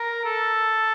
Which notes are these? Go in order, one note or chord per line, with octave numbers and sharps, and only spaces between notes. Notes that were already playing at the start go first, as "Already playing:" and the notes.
Already playing: A#4
A4